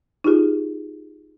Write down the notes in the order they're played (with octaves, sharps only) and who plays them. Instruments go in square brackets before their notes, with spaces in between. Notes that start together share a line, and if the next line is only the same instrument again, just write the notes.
[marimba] D#4 F4 G4 G#4